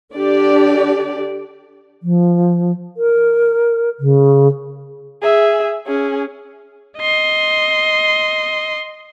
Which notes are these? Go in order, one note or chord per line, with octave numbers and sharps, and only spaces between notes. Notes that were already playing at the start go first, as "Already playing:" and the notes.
D3 D4 G4 D5
F3
A#4
C#3
G#4 E5
C#4 G#4
D#5 C6